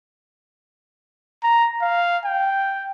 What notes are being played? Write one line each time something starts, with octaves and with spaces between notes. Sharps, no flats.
A#5
F5
G5